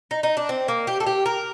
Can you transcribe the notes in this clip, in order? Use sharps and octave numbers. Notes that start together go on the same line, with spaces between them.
D#4
D#4
D4
C4
A#3
G4
A4
G4
A#4